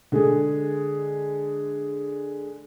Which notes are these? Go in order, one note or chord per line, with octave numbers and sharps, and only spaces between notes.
D3 G#3 G#4